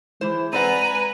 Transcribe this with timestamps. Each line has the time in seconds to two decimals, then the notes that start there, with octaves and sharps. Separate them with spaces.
0.21 E3 G#3 E4 C5
0.53 C4 B4 D5 F#5 G#5 A#5 D#7